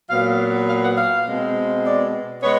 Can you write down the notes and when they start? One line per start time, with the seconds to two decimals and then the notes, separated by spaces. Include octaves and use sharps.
0.09 A#2 F#3 B3 F5
0.68 F5
0.83 F#5
0.97 F5
1.26 B2 G#3 C4
1.84 D5
2.43 G#3 B3 C#5